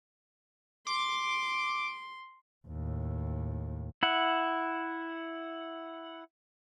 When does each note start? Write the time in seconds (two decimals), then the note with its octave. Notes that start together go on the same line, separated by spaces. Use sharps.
0.87 C6 D6
2.67 D#2 A2
4.03 E4 F#5